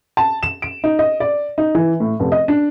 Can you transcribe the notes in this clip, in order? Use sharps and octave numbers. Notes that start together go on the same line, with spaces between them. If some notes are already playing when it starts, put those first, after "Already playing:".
A5
E7
D7
D#4
D#5
D5
D#4
E3
A2
F1
D#5
D4